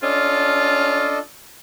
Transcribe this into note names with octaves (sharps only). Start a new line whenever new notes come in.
C#4 D4 F4 A4 D#5